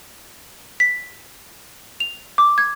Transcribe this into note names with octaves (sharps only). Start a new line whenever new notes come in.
B6
F7
D6
G#6